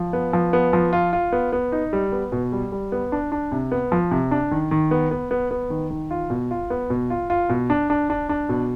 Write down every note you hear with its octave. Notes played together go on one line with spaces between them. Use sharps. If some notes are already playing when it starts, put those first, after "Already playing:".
Already playing: F3
B3
F3
B3
F3
F4
F4
B3
B3
D#4
G3
B3
B2
G3
G3
B3
D4
D4
C3
B3
F3
C3
D4
D#3
D#3
B3
B3
B3
B3
D#3
D#3
F4
B2
F4
B3
B2
F4
F4
B2
D4
D4
D4
D4
B2